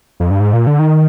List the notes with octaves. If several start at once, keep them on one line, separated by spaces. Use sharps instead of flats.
F2
G2
G#2
A#2
D3
D#3